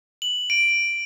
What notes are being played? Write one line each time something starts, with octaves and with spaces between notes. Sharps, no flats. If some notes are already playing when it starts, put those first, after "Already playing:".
F#7
D7